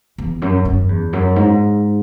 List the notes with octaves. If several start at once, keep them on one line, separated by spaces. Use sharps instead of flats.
E2
F#2
F#2
E2
F#2
G#2